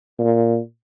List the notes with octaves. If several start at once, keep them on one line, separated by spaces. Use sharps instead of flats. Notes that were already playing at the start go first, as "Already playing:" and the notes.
A#2